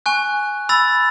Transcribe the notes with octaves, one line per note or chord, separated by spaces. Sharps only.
G#5 C#6 F#6
B5 E6 A6